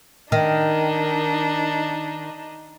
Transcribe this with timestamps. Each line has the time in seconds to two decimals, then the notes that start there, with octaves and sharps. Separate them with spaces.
0.32 D#3 D4 D#4